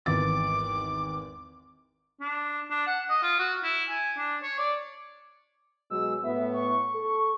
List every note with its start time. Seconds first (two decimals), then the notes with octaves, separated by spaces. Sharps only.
0.06 G#1 E2 D6 A6
2.21 D4
2.70 D4
2.87 F#5
3.10 D#5
3.23 F4
3.39 F#4
3.64 E4
3.89 G#5
4.18 D4
4.43 C#5
4.59 D5
5.90 B2 F#3 G#3 E6
6.24 A2 B3 E5
6.54 C#6
6.94 A4